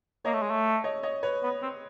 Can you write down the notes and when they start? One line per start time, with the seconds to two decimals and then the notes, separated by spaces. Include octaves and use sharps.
0.25 A#3 C#5 D#5
0.33 A3
0.42 G#3
0.51 A3
0.84 C#5 D#5
1.03 C#5 D#5
1.23 B4 C#5
1.43 B3
1.62 C4